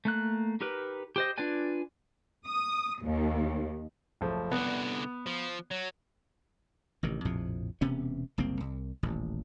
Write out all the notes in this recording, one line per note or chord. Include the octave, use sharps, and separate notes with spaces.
A3 A#3 F#6
D#4 G4 A#4 B4
G4 C5 D#5
D4 F4 B4 D5 G#5
D#6
D#2
F#1 F3 A3
C2 D3 B3
F3
F#3
A1 C3 D#3
A#1 F2 A2 C3
E1 C3 B3 C#4
F#1 C2 A#3 C4
C2
D#1 A1